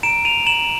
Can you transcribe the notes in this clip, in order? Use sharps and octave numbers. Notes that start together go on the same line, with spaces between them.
A#5 D7 E7
D#7 F7
A#5 E7 F#7